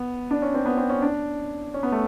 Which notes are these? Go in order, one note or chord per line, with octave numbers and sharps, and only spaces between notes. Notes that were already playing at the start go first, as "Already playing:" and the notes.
Already playing: B3
D4
C#4
C4
B3
C4
C#4
D4
C#4
B3
A3